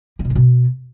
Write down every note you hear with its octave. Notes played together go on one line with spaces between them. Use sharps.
A#3
B2
G#2
B2